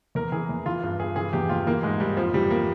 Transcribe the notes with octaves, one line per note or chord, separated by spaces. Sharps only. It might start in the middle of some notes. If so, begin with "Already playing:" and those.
E2 A#4
E3 G#4
E2
E3 F4
G2
G2 G#4
E3 G#4
E2 G4
E2 F4
E3 A#3
G#2 G#3
G#2 G3
F2 F3
E3 G3
A#3